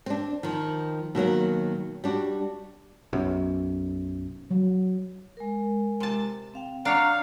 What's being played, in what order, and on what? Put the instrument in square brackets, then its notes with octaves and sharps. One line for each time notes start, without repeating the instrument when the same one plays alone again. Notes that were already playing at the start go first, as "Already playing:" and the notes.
[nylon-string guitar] C4 D4
D#3 F3
B2 D#3 F#3 A#3
G3 D4 F#4
[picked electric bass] B1 F#2
[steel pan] F#3
[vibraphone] G#3 A#4
[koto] C3 A5
[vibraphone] C4 F5 G5
[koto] D4 C#5 [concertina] F5 [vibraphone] F#5 C#6 [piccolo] A#5